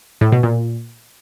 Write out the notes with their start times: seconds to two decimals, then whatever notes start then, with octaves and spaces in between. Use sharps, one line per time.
0.21 A2
0.32 B2
0.43 A#2